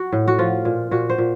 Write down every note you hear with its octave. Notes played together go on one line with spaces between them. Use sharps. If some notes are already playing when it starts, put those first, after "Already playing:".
Already playing: F#4
A2
F#4
F3 F4
A#2
A#2 F#4
C5
A#2